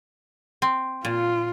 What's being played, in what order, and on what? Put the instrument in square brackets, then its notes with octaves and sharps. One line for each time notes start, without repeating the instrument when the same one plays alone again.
[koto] C4
[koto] A#2 [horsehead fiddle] F4